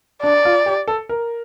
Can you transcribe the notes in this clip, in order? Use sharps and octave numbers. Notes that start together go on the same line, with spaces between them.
D4 D5
F4
G4
A4
A#4